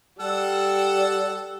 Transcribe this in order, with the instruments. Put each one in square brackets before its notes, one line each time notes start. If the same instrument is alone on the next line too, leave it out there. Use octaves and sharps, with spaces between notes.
[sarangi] G3 [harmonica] A4 F#5 E6